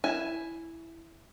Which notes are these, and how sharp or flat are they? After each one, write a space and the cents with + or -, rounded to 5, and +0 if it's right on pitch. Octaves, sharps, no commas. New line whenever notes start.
E4 +0 G#5 +10